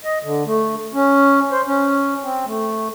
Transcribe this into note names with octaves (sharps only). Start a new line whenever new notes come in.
D#5
D3
A3
C#4
C5
C#4
C4
A3